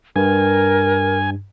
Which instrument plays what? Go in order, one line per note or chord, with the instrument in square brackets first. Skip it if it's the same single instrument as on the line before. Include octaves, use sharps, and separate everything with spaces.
[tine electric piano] G2 [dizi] A#4 [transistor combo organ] G#5